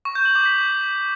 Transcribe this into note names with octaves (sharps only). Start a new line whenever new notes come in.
C#6
G6
F#7
D6
B6